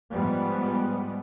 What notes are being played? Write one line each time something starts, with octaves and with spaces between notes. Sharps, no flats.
G#2 F3 G3 B3